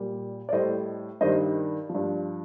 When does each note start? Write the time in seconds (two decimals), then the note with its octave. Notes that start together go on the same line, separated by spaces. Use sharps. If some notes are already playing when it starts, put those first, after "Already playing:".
Already playing: A#2 G3
0.49 D5
0.53 A2 G3 C5 D#5
1.21 G2 D#3 G3 C5 D#5
1.89 F3
1.95 G2